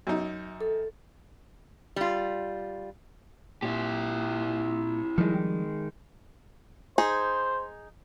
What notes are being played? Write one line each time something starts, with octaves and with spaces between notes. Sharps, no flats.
F#2 D#4
A4
G3 F4
A#2 E4 G4
D#3 F3 G3 G#3
D#4 G#4 C5